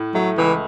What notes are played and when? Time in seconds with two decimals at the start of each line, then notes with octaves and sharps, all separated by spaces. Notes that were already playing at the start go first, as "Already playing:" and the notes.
Already playing: A2
0.14 F#3 A3
0.38 C#2 E3